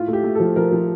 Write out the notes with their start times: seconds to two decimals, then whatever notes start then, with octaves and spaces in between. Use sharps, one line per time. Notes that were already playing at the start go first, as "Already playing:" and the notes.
Already playing: A2 F4
0.08 A3
0.13 G4
0.24 A3
0.35 F3 A4
0.56 F3 A#4
0.72 F3